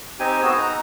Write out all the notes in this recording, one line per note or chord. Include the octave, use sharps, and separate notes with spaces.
C4 D#4 G4 G#5
B3 F#4 G#4 E6
D#4 A#5